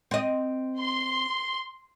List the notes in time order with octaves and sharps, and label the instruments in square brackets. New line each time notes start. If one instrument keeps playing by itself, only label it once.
[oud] C4 D#5
[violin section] C6